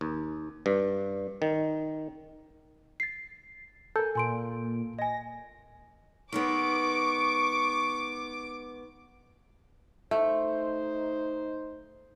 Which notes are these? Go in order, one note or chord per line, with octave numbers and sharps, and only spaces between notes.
D#2
G2
D#3
A6 C7
A4 A#4 G#5 G6
A#2 G#5 C6 D7
D#5 G#5 A#6
D#3 G#3 B3 C#6 D6
A3 D#4 C5